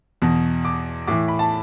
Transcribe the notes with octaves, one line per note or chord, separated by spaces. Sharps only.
E2 B2
D6
A2 E3 D6
B5
A5